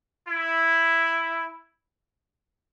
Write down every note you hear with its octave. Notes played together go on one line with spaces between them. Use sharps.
E4